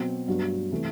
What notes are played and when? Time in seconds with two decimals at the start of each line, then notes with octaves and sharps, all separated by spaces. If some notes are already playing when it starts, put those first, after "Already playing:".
Already playing: B2 F#3 C4
0.28 G2 F#3 B3
0.71 C3 E3 A3